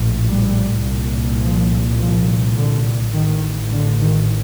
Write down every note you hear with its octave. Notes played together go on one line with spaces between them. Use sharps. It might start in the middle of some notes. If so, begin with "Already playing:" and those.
Already playing: A#1 A2
G3
C2 A#2
F3
F3
D3
A1 A2 D#3
D3
D#3